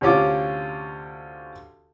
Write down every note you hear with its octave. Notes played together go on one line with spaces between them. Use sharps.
D2 C3 C#4 F4 D6